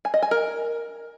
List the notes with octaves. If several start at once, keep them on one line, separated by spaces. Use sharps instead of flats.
G#5
D#5
G#5
A#4